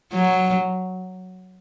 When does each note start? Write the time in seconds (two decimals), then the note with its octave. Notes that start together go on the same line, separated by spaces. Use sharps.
0.13 F#3